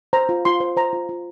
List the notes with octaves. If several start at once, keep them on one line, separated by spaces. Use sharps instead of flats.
C5 A#5
F4
F4 C6
C5
C5 A#5
F4
F4